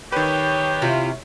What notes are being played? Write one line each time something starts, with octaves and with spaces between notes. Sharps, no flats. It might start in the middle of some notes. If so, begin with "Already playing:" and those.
D#3 G4 B4 C#5
C3 E4 F4